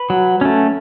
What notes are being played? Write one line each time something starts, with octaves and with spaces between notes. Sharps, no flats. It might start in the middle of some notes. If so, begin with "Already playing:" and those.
Already playing: B4
F#3
A3 C#4